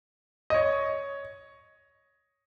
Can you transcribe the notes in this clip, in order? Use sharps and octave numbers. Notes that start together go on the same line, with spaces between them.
D#5
C#5